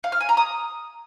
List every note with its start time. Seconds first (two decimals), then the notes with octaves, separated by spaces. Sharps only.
0.04 F5
0.12 F6
0.20 G#5
0.29 A#5
0.37 D#6